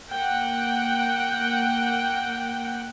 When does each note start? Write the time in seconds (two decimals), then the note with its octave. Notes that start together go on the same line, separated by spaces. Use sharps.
0.11 A#3 F#5 G5